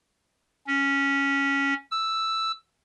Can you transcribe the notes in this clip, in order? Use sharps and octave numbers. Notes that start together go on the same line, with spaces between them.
C#4
E6